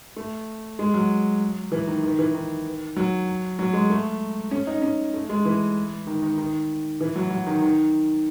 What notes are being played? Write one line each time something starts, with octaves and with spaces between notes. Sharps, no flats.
A3
G#3
F#3
E3
D#3
D#3
E3
D#3
F#3
F#3
G#3
A3
C#4
D#4
C#4
A3
G#3
E3
D#3
D#3
D#3
E3
F#3
F#3
D#3
D#3